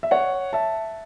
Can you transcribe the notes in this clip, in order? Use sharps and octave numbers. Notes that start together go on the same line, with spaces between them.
E5
C#5 F#5
E5 A5